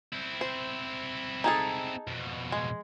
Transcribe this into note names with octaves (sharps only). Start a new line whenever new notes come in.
C4 E4
C5
D#4 G#4 A4
F2 B2
G#3